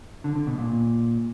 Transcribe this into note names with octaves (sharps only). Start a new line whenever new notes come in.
D3
D3
B2
A#2